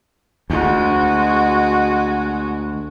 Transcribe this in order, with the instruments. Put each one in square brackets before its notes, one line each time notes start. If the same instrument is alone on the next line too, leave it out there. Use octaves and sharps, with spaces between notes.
[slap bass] D2 [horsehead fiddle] G#3 F#4